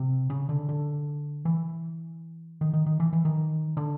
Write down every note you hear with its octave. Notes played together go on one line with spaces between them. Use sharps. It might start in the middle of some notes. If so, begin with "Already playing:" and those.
Already playing: C3
C#3
D3
D3
E3
D#3
D#3
D#3
E3
E3
D#3
D3